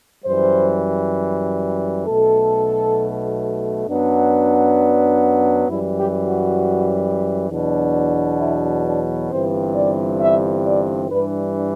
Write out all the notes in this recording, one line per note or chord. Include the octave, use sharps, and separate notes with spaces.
F#2 E3 G3 C5
B1 B2 A3 A4
F#2 F#3 B3 D4
F#2 E3 G3 E4
G4
F#4
E2 B2 F#3 B3 D4
E4
D4
G1 G2 E3 G3 C4 C5
D5
E5
D5
G2 E3 G3 D4 B4